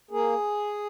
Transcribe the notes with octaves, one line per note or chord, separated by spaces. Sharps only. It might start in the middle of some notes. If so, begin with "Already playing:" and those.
A#3 G#4